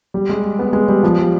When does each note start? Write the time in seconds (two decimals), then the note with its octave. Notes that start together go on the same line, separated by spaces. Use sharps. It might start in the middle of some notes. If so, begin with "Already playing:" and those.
0.14 G3
0.29 G#3
0.59 B3
0.73 G#3
0.88 G3
1.03 F3
1.19 G3